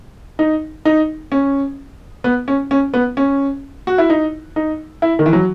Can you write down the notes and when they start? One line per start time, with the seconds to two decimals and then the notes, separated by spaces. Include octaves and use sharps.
0.39 D#4
0.85 D#4
1.32 C#4
2.24 B3
2.48 C#4
2.71 C#4
2.94 B3
3.17 C#4
3.87 F#4
3.98 E4
4.10 D#4
4.56 D#4
5.02 E4
5.19 D#3
5.26 E3
5.33 F#3